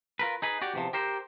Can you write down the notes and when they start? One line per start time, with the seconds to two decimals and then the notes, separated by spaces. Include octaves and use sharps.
0.19 F4 A#4 B4
0.42 D#4 G#4 B4
0.61 F#4 G4 D5
0.74 E2 C3 F3
0.93 G4 A#4 C5